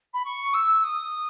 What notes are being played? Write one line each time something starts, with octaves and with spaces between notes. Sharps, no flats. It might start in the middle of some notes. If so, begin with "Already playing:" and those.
B5
C#6
E6
D#6